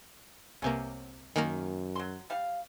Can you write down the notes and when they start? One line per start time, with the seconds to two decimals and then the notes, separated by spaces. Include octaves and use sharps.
0.62 C2 C3 A#3 B3 C#4
1.36 F#2 D#3 A#3 C#4 A#4
1.96 F#3 C6
2.30 G3 F5